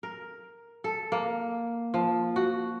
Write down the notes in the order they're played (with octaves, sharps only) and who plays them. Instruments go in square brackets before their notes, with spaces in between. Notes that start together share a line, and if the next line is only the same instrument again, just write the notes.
[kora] A#4
A4
A#3
F3
F#4